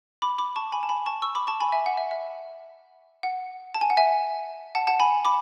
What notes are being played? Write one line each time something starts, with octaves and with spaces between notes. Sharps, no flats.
B5 D6
B5 D6
A5 C#6
G#5 B5
A5
G#5 B5
A5 C#6
C#6 E6
B5 D6
A5 C#6
G#5 B5
E5 G#5
F#5
E5
E5
F#5
A5
G#5
F#5
E5 G#5
F#5 A5
F#5 A5
G#5 B5
B5 D6